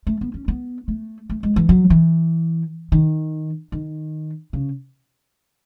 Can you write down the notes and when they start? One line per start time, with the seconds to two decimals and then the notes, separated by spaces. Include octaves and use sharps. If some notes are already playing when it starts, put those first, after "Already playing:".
0.07 A3
0.21 B3
0.34 C#4
0.48 B3
0.88 A3
1.30 A3
1.43 G#3
1.56 E3
1.69 F#3
1.90 E3
2.92 D#3
3.72 D#3
4.53 C#3